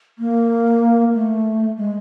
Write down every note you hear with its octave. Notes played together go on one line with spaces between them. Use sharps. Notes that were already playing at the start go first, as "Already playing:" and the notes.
A#3
A3
G#3